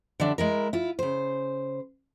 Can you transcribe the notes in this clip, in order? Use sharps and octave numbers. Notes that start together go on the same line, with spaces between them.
D3 F#3 G3 D4 E5
G#3 E4 A#4
E4 F4
C#3 C5